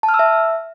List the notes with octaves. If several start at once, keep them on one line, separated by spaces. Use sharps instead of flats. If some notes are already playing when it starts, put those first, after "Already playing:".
A5
F6
E6
E5